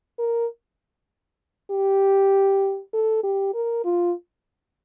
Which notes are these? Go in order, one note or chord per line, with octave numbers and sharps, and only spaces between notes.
A#4
G4
A4
G4
A#4
F4